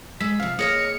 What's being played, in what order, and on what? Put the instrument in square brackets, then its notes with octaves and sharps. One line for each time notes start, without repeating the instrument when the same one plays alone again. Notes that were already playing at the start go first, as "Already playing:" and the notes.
[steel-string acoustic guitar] G#3 [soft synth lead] E6 [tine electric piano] B6
[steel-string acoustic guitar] C3 F3 [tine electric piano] F5
[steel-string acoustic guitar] A#3 C#5 D#5 [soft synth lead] G#4 [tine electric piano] D#6 F6 A#6 [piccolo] C#7